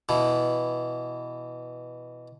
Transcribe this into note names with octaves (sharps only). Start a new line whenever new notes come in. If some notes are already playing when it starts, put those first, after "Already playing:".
B2 E3